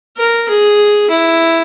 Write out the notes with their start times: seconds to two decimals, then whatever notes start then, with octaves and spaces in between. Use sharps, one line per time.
0.17 A#4
0.48 G#4
1.10 E4